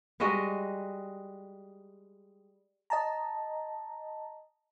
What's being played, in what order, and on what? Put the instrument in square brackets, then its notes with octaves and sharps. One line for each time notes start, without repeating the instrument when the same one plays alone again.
[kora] G3 G#3 F#4 D#5
[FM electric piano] D#5 A5 A#5